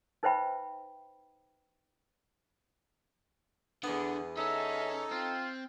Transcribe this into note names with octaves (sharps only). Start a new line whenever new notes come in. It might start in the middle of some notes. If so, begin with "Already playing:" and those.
D#4 B4 C5 E5 G5 B5
E2 D3 B3
C#4 D#4 A4 E5
C4 F4